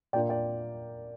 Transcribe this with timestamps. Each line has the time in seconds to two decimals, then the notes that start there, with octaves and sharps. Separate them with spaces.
0.13 A#2 A#3 D4 F4 D5 G5
0.29 D5 G5